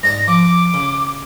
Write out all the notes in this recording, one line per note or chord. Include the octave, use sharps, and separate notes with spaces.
G#2 D5 A5 A#6
F3 D6
C#3